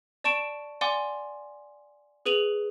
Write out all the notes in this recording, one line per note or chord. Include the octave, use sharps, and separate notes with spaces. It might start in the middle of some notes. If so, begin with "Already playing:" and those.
D5 A5 C#6 D7 E7
D5 F#5 G#5 C6 D6
G#4 B4 D#7 F7 F#7